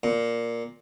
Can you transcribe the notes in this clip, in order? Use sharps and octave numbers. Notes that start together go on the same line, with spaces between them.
A#2